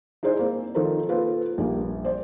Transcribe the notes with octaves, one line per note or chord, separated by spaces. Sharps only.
D#4 E4 G#4 C5 D5
A#3 C4
D#3 F3 D#4 A4 A#4 C5
A#3 F4 A4 B4 C5
A#1 G3 A#3
C5 D5